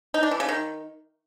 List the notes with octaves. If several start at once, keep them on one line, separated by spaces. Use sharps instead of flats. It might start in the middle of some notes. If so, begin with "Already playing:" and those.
D#4
D4
E3
C#3
D#3